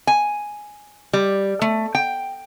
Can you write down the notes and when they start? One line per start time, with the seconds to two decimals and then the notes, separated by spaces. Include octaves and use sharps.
0.07 G#5
1.13 G3
1.62 A3
1.95 G5